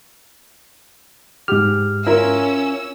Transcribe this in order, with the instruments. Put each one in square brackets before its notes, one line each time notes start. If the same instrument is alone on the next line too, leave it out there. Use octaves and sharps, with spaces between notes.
[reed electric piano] G#2 F6 [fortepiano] G4
[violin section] C#4 E6 [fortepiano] E4 F4 A#4